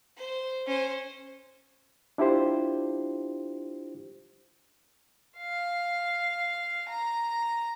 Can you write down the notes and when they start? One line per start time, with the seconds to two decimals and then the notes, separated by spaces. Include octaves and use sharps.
0.16 C5
0.66 C#4 C5
2.18 D4 E4 F4 G4 C5
5.37 F5
6.89 A#5